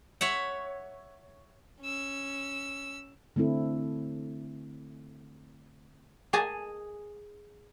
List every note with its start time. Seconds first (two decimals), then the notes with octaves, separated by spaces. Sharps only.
0.21 C#5 E5 F#5
1.81 C#4 E6
3.36 D3 A3 C4 E4 A4
6.33 G#4 D#5 G#5 A5